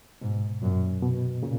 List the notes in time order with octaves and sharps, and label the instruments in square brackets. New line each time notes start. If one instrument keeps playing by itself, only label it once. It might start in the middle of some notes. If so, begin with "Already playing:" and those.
[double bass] G#2 [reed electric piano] B2
[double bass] F#2 [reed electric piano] A#2
[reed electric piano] B2
A#2 C#3